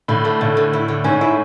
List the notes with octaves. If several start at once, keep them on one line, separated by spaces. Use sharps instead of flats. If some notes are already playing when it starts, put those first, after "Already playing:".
A2 D3
A3
A2 D3
D3
E4
D3
G#2 C#4
E4